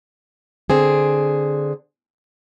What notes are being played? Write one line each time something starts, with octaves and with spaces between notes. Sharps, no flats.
D3 C4 G#4